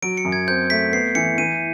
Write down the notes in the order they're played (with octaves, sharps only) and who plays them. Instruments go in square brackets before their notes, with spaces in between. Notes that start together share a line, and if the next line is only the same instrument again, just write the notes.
[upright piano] F#3 [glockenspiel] D7
[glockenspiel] C#7
[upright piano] F#2
[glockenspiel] G#6
[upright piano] C4 [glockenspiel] G6
[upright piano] A3 [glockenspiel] B6
[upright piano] B3 [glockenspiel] C7
[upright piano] E3 [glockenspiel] C#7
[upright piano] E3 [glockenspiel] D#7